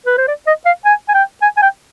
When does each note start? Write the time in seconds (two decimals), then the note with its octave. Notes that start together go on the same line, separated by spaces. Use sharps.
0.07 B4
0.18 C5
0.28 D5
0.47 D#5
0.65 F5
0.85 G#5
1.09 G#5
1.14 G5
1.42 G#5
1.57 G#5
1.62 G5